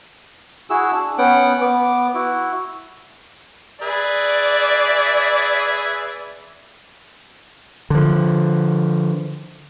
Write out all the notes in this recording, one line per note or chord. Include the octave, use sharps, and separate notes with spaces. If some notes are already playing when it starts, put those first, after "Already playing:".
E4 F#4 G#4 E6
D4
B3 C#4 F#5 G5
B3 D6
E4 F#4
G#4 B4 D5 E5
D3 F3